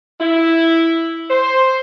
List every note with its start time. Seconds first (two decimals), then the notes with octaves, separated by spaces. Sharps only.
0.19 E4
1.30 C5